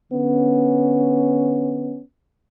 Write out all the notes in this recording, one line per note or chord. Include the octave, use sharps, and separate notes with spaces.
D3 B3 C#4